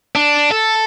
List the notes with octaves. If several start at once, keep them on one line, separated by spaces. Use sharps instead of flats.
D4
A4